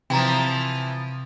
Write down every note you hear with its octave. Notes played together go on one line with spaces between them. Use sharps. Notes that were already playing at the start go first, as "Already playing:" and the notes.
C3 E3 F3 G5 A#5